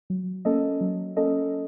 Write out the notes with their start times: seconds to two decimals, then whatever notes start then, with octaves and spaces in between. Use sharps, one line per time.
0.10 F#3
0.45 A#3 C#4 A4 D#5
0.81 F#3
1.17 A#3 C#4 A4 D#5